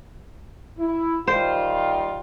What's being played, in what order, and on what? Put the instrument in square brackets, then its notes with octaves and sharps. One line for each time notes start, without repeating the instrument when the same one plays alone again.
[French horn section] E4
[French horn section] D#3 G3 F4 [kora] C5